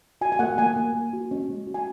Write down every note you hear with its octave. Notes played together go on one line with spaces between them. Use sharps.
F#4 G#5
G#5
A#3 F#5
A#3 G#5
A#3
A#3
F#4
C#4
G#3
F#4
G#5